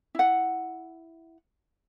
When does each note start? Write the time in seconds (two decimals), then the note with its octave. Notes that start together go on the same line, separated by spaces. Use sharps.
0.15 E4 F#5